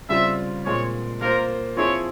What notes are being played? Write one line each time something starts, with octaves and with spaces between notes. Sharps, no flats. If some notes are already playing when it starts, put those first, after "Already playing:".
C#3 G3 C4 F4 E5
A#2 G#3 C4 C#5
A#3 F4 A#4 C5
F3 C4 E4 G#4 C#5